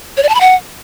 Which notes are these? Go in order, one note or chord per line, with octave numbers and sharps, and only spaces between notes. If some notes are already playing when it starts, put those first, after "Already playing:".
C#5
D5
A5
B5
F#5